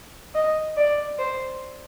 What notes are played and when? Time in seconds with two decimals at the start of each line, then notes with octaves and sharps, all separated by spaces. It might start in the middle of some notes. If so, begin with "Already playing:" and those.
0.35 D#5
0.76 D5
1.19 C5